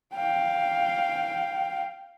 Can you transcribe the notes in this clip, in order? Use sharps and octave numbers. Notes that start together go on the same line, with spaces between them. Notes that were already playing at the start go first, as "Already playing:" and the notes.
F5 G5